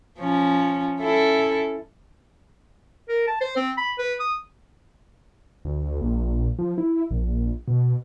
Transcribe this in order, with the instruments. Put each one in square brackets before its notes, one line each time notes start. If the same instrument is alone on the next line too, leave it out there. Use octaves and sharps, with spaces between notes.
[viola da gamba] F3 C#4
C#4 E4 A4
[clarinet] A#4
A5
C5
C4
B5
B4
D#6
[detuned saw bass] D2
A#1
F3
E4
A#1
B2